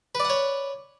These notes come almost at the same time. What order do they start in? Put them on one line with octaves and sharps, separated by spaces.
B4 D5 F#5 C#5